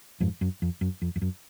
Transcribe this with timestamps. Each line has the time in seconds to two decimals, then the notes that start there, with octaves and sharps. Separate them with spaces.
0.20 F2 G#2
0.41 F#2
0.62 F2
0.81 F#2
1.02 F2
1.16 F2
1.22 F#2